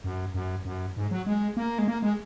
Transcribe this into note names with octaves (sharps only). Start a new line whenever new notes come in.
F#2
F#2
F#2
G#2
F#3
G#3
A#3
G#3
A#3
G#3